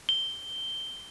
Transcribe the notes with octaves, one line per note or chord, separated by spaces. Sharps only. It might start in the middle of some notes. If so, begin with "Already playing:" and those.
G7